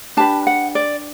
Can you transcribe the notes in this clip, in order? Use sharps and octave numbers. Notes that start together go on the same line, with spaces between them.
D4 G4 B4 A5
F#5
D5